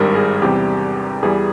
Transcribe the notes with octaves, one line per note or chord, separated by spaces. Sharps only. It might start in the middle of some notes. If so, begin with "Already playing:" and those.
Already playing: G#1 G2 G3 A#4
G#4
E2 C3 G3 G4
E2 E3 G3 G#4